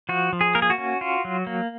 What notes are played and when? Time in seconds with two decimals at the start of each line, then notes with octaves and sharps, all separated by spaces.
0.09 F3 F#4
0.33 F3
0.41 G#4
0.55 A#3 A#4
0.62 G#4
0.70 F#4
0.78 C#4
1.01 F4
1.25 F#3
1.47 A#3